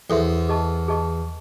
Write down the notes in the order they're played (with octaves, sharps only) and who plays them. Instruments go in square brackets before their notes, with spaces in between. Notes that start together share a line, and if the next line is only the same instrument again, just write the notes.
[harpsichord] E2 [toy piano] A4 C5 E5 C6
[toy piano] G#4 D#5 A5 C#6
G#4 D#5 A5 C#6